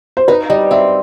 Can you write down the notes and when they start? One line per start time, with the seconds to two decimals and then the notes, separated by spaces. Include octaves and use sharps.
0.17 C5
0.28 D#4 B4
0.50 G3 D#5
0.71 C4 E5